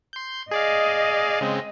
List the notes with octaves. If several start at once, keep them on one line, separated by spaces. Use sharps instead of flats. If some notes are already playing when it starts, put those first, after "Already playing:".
C6 G6
G#4 D5 D#5 F5
C#3 G#3 C4